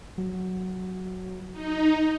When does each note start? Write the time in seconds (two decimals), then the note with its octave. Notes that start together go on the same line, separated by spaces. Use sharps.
0.18 F#3
1.52 D#4